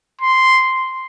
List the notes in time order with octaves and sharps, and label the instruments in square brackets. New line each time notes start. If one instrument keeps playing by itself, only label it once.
[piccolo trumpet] C6